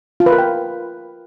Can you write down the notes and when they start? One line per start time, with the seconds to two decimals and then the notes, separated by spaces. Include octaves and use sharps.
0.20 F4
0.26 B4
0.32 A#4
0.38 G5